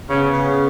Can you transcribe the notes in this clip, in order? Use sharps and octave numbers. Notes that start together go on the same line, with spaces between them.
C#3 B3 C#4
C#3